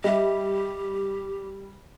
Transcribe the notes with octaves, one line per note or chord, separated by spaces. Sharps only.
G3 G4 D#5 E5